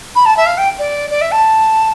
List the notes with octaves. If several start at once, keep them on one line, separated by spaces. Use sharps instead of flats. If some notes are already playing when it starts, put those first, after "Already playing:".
B5
A5
E5
F5
G5
D5
D5
E5
A5